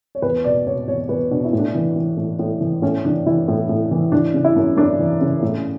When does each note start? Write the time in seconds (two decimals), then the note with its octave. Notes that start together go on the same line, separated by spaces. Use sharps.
0.15 C#5
0.22 E2 B4
0.44 B2 D5
0.66 B2 C#5
0.88 E2 C#5
1.09 E2 B4
1.31 B2 D4
1.45 E4
1.53 A2
1.58 D4
1.75 E3
1.96 E3
2.17 A2
2.39 A2
2.61 E3
2.82 A2 C#4
3.05 E3 D4
3.26 E3 E4
3.48 A2
3.69 A2
3.91 E3
4.12 E3 D4
4.34 C#3
4.44 E4
4.56 F#2
4.77 F#2 D4
4.99 E3
5.21 C#3
5.42 A2